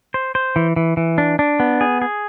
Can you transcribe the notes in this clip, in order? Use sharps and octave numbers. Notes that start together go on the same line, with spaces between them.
C5
C5
E3
E3
E3
D4
D4
B3
G#4
G#4